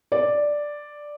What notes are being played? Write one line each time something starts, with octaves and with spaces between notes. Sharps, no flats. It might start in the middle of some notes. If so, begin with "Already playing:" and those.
D5